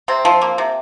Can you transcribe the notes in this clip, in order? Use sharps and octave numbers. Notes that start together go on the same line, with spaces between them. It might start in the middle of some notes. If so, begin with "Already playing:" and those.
C3 C4
F3
A#3
C3